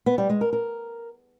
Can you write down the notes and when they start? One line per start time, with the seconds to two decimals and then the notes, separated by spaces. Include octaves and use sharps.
0.06 B3
0.18 G3
0.29 G#3
0.41 A#4
0.53 A#4